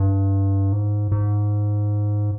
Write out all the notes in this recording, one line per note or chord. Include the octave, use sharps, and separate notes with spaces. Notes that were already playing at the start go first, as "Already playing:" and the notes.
Already playing: G2
G#2
G#2